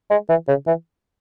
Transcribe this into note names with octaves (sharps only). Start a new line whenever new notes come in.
G#3
E3
C#3
E3